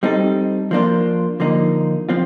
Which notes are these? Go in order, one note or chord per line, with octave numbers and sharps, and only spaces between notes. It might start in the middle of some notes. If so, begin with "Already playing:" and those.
G3 C4 D#4 A4
F3 A#3 D4 F4
D3 F3 A#3 D#4
F3 C4 F4